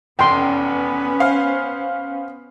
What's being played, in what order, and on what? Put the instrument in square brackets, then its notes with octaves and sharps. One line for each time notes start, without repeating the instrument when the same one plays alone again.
[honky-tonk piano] F1 E2 [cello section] B3 C#4 [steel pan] G5 C6
[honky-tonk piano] C5 F5